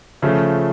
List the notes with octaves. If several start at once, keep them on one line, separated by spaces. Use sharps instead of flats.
C#3 F3 A3